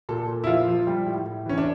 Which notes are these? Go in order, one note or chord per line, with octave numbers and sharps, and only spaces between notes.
A#2 A4
A#2
E4
F3 F4
F3
G3
A2
A2
E3 C#4
D4